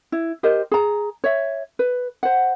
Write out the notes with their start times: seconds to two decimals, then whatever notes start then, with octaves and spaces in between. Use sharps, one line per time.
0.12 E4
0.43 G4 A#4 C5 D#5
0.71 G#4 A#5
1.24 C#5 E5
1.79 B4
2.23 C5 F#5